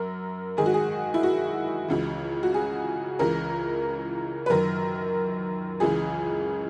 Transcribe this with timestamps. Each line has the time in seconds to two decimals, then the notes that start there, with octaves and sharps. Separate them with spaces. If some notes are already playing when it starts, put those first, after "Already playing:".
Already playing: F#2 A#4
0.57 G#2 D#3 G#4
0.66 F#4
0.74 G#4
1.14 E4
1.23 F#4
1.88 C#2 C#3 E3
2.43 F#4
2.54 G#4
3.19 C#2 C#3 E3 A#4
4.46 B4
4.50 F#2 D#3 A#4
5.80 C#2 C#3 E3 G#4